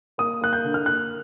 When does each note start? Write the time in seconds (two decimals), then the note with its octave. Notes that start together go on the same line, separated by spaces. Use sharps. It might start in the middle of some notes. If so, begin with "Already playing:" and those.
0.18 A#3 D#6
0.41 A#3 F#6
0.53 G6
0.64 D3
0.74 F6
0.86 A#3 F#6